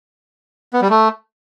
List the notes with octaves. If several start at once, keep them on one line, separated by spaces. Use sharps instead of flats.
B3
G3
A3